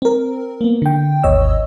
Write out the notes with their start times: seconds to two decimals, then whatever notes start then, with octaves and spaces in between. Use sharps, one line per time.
0.02 C4 A#4
0.61 A#3 B3
0.82 D3 G5
1.23 G#1 D#2 C#5 D#5 E6